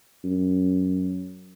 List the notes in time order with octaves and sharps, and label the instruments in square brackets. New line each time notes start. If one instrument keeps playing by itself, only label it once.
[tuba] F#2